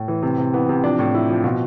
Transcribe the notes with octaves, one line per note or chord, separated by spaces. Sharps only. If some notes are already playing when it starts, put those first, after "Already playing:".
Already playing: A2
E3
C3
C3
E3 B3
C3
F3 D4
A2
F3 E4
F3
B2 F4